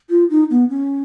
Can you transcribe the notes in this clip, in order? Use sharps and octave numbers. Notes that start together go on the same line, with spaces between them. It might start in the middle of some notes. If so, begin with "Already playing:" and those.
F4
D#4
B3
C#4